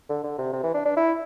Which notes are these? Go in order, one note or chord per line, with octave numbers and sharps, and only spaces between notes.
D3
D3
C3
C3
E3
D4
D4
E4